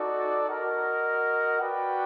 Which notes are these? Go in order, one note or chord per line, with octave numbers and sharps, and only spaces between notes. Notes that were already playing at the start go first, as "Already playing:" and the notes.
Already playing: D#4 F#4 A4 D5
F#4 A#4 D#5 F#5
F#4 B4 D5 G5